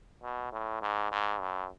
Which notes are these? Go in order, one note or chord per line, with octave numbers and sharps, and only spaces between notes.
B2
A2
G#2
G#2
F#2